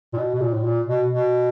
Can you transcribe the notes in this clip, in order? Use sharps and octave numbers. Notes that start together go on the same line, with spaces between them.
A#2
B2
B2
A#2
A2
A#2
B2
B2